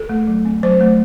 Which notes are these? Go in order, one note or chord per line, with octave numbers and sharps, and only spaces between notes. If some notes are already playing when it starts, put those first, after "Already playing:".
Already playing: A4
A3
F#3
C4
F#3 C5
A3